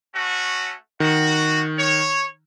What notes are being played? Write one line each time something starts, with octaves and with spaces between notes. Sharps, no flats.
A3 C#4 F#4
D#3 F#4
C#5